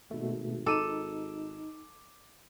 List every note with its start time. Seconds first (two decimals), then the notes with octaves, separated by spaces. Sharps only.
0.11 G#1 B2 A3
0.66 D#4 A4 D6 D#7 E7